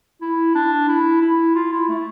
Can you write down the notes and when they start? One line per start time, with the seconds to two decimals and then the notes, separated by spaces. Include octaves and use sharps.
0.21 E4
0.55 D4
0.88 E4
1.21 E4
1.55 F4
1.72 E4
1.89 A3